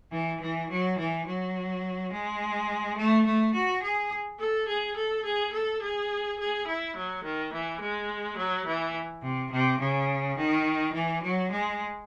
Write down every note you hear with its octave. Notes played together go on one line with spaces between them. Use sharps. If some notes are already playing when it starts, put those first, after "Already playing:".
E3
E3
F#3
E3
F#3
G#3
A3
A3
F#4
G#4
A4
G#4
A4
G#4
A4
G#4
G#4
E4
F#3
D#3
E3
G#3
F#3
E3
C3
C3
C#3
D#3
E3
F#3
G#3